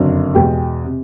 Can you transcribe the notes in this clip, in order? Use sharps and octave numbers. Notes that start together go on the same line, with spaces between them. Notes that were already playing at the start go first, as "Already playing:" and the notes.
Already playing: F#1 F2 D3 F#3
E2 B2 G#3 G4 G5
C3